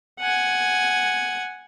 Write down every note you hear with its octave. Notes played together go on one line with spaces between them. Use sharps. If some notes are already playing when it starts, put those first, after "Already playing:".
F#5 G#5